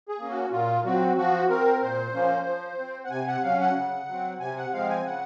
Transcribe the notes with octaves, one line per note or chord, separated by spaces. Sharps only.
G#4
A#3 C#4
F#4
A#2 F4
F#3 C4 F#4
F3 F#4
C4 A#4
A#2 C5
F3 A#3 C#4
F3
C4
F#5
C3 G#5
F#5
F#3 C#4 F5
F#5
C#3
F#3 C4
C3 G#5
F#5
F3 G#3 C4 F5
G#5
C#3 F#5